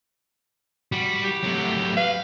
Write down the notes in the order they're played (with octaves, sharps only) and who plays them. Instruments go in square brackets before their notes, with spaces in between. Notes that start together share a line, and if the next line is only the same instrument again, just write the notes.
[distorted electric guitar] G3 [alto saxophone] F#4
[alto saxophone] G4
[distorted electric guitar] A2 F#3
[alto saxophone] B4 [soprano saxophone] F5